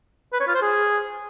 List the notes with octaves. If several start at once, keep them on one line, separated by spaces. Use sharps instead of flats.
B4
C#5
F4
C5
G#4